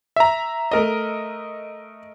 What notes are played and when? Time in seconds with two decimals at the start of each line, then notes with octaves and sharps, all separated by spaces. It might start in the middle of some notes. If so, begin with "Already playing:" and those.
0.16 E5 A#5
0.71 A3 A#4 D#5